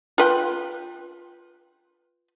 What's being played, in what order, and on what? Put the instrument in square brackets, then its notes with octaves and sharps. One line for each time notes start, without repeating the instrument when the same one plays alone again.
[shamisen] F4 B4 G5